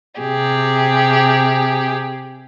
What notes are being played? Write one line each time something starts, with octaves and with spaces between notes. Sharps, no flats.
C3 G4 G#4